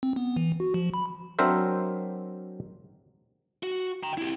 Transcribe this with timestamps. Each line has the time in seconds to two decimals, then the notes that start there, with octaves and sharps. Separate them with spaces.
0.03 C4
0.16 B3
0.36 E3
0.60 F#4
0.74 F3
0.94 B5
1.39 F#3 C4 D4 A#4 C5 E5
3.63 F#4
4.03 G5 A#5
4.18 E4 G4